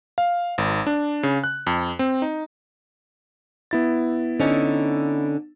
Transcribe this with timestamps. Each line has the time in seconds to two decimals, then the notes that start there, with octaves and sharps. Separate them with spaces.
0.18 F5
0.58 G#1
0.87 D4
1.23 C#3
1.44 F#6
1.67 F2
1.99 C4
2.22 D#4
3.71 B3 E4 A6
4.40 D3 C#4 D#4